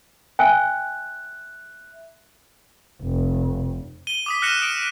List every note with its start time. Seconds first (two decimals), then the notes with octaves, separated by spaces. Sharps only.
0.39 E5 G5 G#5 F#6
3.03 F1
4.07 D#7 G7
4.26 D6 D#6 B6
4.42 F6 F#6 A#6 C#7 D#7 E7
4.62 D#6 F6 D7